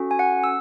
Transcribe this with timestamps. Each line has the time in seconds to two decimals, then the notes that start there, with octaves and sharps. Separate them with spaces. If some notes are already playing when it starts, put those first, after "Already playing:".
Already playing: C#4 F#4 A4
0.11 G#5
0.19 F#5
0.44 E6